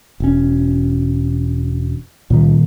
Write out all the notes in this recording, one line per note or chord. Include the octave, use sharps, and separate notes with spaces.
E1 C#4
C#2 A#2 D#3 G3